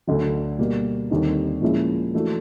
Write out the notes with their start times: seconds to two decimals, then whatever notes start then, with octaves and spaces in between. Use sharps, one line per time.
0.07 D2 D3 F#3
0.59 B2 G3 A#3
1.10 D#2 D3 G3 C4 D#4
1.62 A#2 F3 G#3 C#4 E4
2.14 E3 A3 D4 F#4